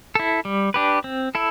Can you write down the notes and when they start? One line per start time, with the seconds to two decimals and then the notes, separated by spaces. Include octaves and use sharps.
0.15 E4 A4
0.45 G3
0.74 D4 G4 B4
1.04 C4
1.35 E4 A4